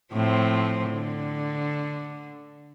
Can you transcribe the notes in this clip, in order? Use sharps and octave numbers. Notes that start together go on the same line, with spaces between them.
A2 F3 C4
D3